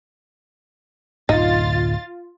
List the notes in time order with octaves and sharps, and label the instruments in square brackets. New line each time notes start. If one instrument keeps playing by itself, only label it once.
[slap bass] D1 F#2 D3 [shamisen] D#4 [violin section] F4 A6